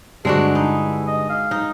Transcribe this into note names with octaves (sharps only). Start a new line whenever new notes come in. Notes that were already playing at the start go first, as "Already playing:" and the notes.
G2 D3 G#3 D4 F#4 A4
D#4 E4
D#5
F5
D#4